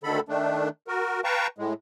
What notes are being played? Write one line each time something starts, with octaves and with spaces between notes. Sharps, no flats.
D2 D3 D#3 A4 B5
D#3 A3 D4
F#4 A#4
B4 F5 G5 A5 A#5 C#6
A2 G#3